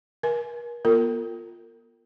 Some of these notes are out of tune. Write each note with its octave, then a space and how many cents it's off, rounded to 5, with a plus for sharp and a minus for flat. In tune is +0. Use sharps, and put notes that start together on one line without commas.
A#4 +40 G#5 +20
B3 -40 F4 +5 A#4 -40